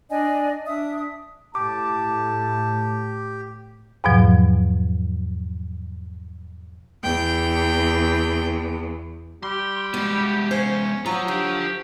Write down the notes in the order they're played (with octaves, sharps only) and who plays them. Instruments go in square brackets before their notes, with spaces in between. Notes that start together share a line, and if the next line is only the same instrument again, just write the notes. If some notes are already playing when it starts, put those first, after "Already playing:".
[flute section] D4 D5 D#5 G#5
D4 E5 D#6
[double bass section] A2 [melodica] G4 [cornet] A5 [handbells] D6
[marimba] E2 G#2 B2 F3 F#3
[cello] E2 [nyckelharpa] G5
[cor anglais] G3 [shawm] G4 [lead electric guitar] C6
[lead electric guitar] G#3 B3 [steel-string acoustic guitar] F#4
[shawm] C#4 [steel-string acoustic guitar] C5
[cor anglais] F#3 [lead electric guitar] F4 C5 [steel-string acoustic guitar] A#5
[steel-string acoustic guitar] D3 [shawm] G4